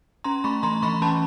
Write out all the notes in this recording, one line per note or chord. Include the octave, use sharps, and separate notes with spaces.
C#4 A#5 C6
A3 B5 C#6
E3 A#5 C6
E3 B5 C#6
C#4 A5 B5